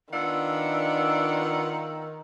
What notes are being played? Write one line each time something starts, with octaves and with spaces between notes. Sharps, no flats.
D#3 B3 D4 F4 F#5 E6